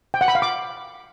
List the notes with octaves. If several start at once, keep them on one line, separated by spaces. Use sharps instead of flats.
G5
F#5
B5
F5
D6